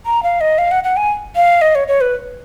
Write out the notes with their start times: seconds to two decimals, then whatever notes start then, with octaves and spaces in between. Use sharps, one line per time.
0.06 A#5
0.23 F5
0.41 D#5
0.58 F5
0.71 F#5
0.84 F#5
0.97 G#5
1.36 F5
1.62 D#5
1.75 C#5
1.88 C#5
2.01 B4